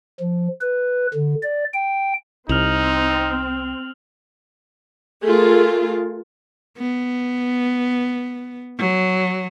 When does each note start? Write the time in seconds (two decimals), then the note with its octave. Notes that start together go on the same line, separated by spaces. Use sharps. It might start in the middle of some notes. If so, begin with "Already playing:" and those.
0.20 F3
0.61 B4
1.14 D3
1.43 D5
1.74 G5
2.49 C2 C4 D#4 F6 F7 F#7
5.25 A3 F4 G#4 A#4
6.78 B3
8.79 F#3